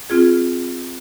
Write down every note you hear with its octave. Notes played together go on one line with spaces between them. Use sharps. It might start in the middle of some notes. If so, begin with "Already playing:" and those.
C4 F4 G#4